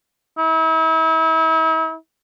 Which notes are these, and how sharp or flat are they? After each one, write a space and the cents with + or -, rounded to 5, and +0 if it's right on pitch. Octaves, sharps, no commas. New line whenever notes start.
E4 -40